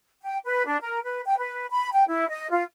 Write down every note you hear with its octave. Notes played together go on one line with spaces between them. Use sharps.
G5
B4
D4
A#4
B4
G5
B4
B5
G5
E4
D#5
F4